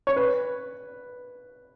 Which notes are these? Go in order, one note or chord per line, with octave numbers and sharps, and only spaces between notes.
C#5
B4